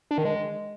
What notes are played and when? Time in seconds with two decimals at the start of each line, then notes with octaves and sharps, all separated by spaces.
0.11 D4
0.18 D#3
0.25 G#3